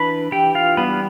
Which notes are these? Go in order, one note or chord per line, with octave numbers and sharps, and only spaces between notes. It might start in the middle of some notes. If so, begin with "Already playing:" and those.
Already playing: E3 D4 B4 B5
E3 G4 G5
F4 F5
G3 B3 B4